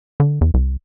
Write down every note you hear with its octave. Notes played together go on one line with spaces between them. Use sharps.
D3
E2
C2